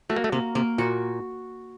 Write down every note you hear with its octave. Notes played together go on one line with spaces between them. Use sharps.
A3 F#4
A#3
A3
C3 A#3
C3 A#3
A#2 F#4